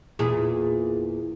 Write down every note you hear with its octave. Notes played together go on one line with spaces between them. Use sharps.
E2 A#2 G#4